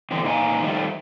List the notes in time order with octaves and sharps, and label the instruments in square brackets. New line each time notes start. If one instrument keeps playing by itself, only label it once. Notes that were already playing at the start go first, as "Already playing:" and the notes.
[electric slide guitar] E2 D3 C4
A#2 D#4 G4 F5 G#5
D#3 F3 G3 A3